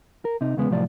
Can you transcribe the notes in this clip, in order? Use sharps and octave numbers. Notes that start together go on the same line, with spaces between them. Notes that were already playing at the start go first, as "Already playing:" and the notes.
A#4
C3 D#4
E2 C#3 G#3 B3
C2 A2 F3 F#3 D5